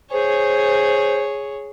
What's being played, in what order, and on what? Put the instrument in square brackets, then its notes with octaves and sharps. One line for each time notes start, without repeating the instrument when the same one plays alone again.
[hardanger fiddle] G#4 C#5 [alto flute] C5